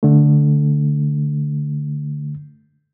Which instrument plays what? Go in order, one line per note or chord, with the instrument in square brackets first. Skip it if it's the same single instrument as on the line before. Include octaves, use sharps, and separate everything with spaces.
[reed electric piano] D3 A3